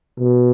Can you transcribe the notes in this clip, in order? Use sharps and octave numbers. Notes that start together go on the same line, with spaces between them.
B2